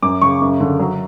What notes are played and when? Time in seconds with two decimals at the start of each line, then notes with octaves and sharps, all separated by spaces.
0.02 F#2 D6
0.21 C#3 C#6
0.42 F#2
0.60 D3
0.80 F#3